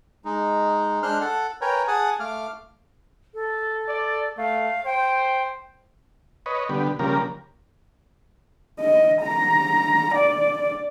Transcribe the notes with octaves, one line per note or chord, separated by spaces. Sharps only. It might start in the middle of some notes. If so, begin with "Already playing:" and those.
G#3 D#4
G#3 D4 C5 C6 F6 F#6
A4 F#5 A5
A#4 B4 C#5 G5 G#5 A#5
G#4 F#5 G#5 A5 D#6
A3 F5 D6 F6
A4
D5
A3 F5
C5 G5
B4 C#5 D#5
D3 G3 B3
C#3 F3 G3 A#3 A#4
D#5
A#5
D5